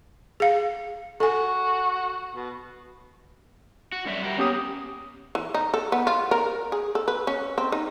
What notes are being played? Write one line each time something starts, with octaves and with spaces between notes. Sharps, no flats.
G#4 F5
F#4 A4 G#5
B2
F#4
F#2 G3 E5
G3 F#4 A#4
A#3 B3 C#4 G4 D#6
E3
D#4
A4
B3
F4
A#4
G#4
A4
B4
C#4
C4
D#4